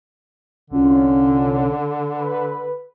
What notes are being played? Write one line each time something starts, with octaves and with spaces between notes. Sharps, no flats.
C2 D3 C#4 F4
B4